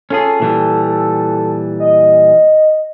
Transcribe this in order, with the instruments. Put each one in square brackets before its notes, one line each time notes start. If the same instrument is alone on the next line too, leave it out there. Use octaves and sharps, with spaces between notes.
[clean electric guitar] C#4 F4 G#4 [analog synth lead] A4
[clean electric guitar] A#2 E3 G3
[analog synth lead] A4
D#5